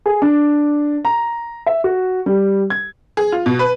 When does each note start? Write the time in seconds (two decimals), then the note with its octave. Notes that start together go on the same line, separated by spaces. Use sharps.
0.06 G#4
0.22 D4
1.05 A#5
1.66 E5
1.84 F#4
2.26 G3
2.70 G#6
3.17 G#4
3.32 F4
3.46 B2
3.59 B4